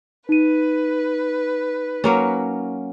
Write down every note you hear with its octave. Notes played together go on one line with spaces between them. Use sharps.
D#4 B4 D#7
F#3 A#3 C#4